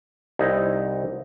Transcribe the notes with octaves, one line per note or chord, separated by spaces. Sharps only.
C2 D#4 E4